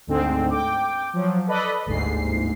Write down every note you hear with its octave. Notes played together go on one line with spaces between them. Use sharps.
D2 G#2 D3 C4
G5 D6
F3 F#3
A4 B4 D5 D#5 B5
G1 D2 G#2 C7